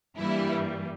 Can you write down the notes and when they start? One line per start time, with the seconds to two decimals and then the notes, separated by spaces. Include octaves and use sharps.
0.17 G2 E3 G3 A#3 E4